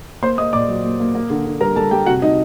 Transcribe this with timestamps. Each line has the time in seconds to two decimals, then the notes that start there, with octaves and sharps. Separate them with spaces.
0.22 A#3 C5 C6
0.38 A#3 D#5 D#6
0.53 A#2 D5 D6
0.68 F#3
0.85 A#3
1.00 A#3
1.15 A#3
1.30 D3
1.46 D3
1.60 G3 A#4 A#5
1.76 G3 A4 A5
1.91 G3 G4 G5
2.06 C3 F#4 F#5
2.22 C3 D#4 D#5